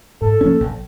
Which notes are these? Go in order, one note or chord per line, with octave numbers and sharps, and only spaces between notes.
G#2 A4
F3 A#3 C#4
A#1